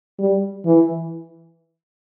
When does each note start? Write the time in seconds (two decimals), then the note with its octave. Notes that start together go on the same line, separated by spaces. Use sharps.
0.19 G3
0.66 E3